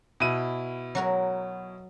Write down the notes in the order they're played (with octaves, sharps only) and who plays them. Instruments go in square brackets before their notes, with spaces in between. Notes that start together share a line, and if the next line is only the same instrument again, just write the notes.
[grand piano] B2 E4 D#7
[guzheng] F#3 F#4 A#4